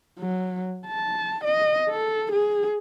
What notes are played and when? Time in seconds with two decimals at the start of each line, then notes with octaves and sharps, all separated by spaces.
0.19 F#3
0.87 A5
1.44 D#5
1.90 A4
2.32 G#4